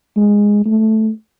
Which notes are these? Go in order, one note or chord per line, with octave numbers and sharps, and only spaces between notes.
G#3
A3